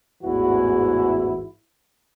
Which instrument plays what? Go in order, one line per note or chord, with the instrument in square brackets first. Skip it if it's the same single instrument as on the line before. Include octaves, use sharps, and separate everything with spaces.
[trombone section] A1 E2 G#2 E3 E4 F#4